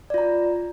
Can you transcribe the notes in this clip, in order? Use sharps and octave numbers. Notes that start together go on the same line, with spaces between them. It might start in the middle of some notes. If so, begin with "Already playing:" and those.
F4 D5 A#5